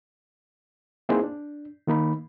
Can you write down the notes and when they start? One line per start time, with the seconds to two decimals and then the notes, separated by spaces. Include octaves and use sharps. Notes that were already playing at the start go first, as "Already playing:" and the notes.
1.09 A#3 C4 D#4 E4 G#4 C5
1.24 D4
1.87 D#3 A#3 D#4 B5